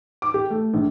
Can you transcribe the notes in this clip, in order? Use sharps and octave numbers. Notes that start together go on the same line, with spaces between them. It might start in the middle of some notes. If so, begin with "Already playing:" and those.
D6
G4
A3
A#1